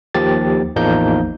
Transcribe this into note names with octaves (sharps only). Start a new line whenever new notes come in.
D#2 D#3 F3 G4 A6
A1 E2 F3 A#3 D#4 G6